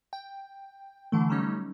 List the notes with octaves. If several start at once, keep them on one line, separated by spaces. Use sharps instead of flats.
G5
D3 E3 A3
F#3 G3 A3 C#4 D#4